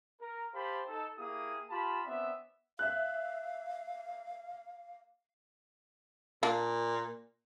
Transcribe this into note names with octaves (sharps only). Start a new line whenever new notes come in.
A#4
G4 C5 F5 A5 B5
D#4 A4
A#3 E4 G4 G#4 D#6
F4 G4 A5 B5
B3 C4 D4 E5
E5 F5 F#6
A#2 A#3 D4